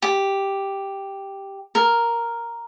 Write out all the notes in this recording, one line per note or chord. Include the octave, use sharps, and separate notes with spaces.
G4
A#4